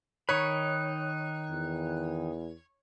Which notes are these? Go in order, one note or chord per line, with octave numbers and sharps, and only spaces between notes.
D#3 D#4 C#5 B5 F#6
E2